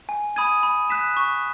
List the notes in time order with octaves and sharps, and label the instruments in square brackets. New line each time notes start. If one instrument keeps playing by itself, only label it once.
[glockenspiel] G#5
B5 D#6 G#6 D#7
B5
F#6 B6 E7
C#6